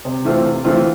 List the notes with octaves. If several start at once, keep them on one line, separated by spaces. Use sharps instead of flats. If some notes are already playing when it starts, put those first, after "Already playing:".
C3
E3 A3 C4 F4
C3
E3 A3 C4 F4